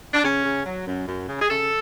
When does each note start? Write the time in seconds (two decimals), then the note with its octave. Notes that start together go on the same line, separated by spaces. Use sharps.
0.13 D4
0.24 C#3 C#4
0.45 C#3
0.66 F#3
0.87 F#2
1.07 F#2
1.28 C#3
1.41 G#4
1.49 C#3 A4